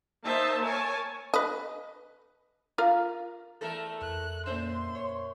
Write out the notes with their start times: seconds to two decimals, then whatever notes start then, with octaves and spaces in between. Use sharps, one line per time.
0.24 A#3 D#4 C5 E5 A5
0.66 A#4 C#5 G#5 A5
1.34 B4 D#5
2.78 F4 A#4 F5
3.61 E2 A3 A4 A#4 E5
4.01 F2 F#6
4.46 A#2 C#4 C5 E5 C6
4.95 C#5